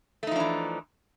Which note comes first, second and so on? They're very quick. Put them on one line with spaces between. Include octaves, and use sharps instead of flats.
A3 D#4 F3 D4 E3